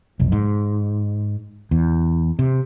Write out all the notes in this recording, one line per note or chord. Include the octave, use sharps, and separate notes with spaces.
F1 B1
G#2
E2
C3